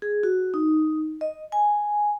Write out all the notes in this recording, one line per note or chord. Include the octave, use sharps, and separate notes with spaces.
G#4
F#4
D#4
D#5
G#5